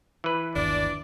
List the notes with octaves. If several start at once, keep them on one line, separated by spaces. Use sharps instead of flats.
E3 B4
G1 D#2 D4 D5